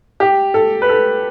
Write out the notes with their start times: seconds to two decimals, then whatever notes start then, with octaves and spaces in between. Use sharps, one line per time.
0.20 G4
0.54 A4
0.82 B4
0.89 A4